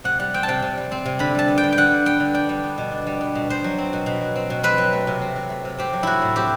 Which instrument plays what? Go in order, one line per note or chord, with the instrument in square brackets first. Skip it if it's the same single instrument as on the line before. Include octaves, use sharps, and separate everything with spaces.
[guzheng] C3 F#5
G3 F#5
C4 G5
A5
C3 G5
C3
G3
C4
C3
D3 B5
G3 A5
B3
G5
D3
G5
D3 F#5
G3
B3 G5
D3
D4 G5
G3
B3
B2
D4
G3
B3
B2
B2 C5
F#3
C4
B2
B2
F#3
C4
B2
C4 B4
F#3
A3
C3
C4
F#3
A3
C3
C4 G4
F#3
A3 E4 F#4
A2
C4 G4